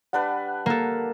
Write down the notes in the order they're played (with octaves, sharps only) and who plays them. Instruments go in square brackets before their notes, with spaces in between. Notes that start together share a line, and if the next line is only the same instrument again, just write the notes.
[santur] G3 D4 B4 [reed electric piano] F#5
[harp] A#3 A4